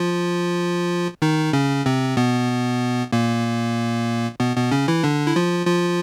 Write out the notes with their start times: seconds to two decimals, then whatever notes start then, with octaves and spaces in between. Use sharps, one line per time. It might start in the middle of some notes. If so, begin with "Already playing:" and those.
Already playing: F3 F4
1.22 D#3 D#4
1.53 C#3 C#4
1.86 C3 C4
2.17 B2 B3
3.12 A#2 A#3
4.40 B2 B3
4.56 B2 B3
4.71 C#3 C#4
4.88 E3 E4
5.03 D3 D4
5.27 E4
5.36 F3 F4
5.67 F3 F4